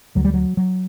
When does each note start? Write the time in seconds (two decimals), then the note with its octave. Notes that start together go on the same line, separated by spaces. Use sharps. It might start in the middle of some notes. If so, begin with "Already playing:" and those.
0.15 D2 D3 F#3
0.25 G3
0.34 F#3
0.57 F#3